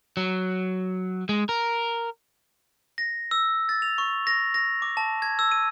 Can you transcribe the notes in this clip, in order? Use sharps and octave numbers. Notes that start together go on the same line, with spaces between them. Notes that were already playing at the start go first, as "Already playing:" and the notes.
F#3
G#3
A#4
A#6
E6
A6
F7
C#6
A#6
A#6
D6
A5
G#6
E6
D#7